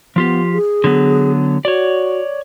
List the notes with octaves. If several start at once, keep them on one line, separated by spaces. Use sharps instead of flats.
F3 B3 F4 G4
G#4
D3 F#3 B3
F#4 C#5 D5